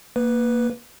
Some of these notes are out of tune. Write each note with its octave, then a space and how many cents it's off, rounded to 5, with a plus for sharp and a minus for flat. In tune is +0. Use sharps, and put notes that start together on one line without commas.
A#3 +0 B4 +0